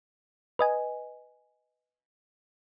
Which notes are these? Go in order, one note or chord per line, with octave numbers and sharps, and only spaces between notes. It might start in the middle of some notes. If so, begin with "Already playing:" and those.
B4 D#5 G#5